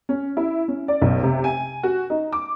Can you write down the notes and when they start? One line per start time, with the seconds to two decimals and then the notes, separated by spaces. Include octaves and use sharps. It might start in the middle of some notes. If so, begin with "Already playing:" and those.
0.09 C#4
0.37 E4
0.68 C#4
0.88 D5
1.02 B1
1.23 C3
1.44 G#5
1.83 F#4
2.10 D#4
2.32 D6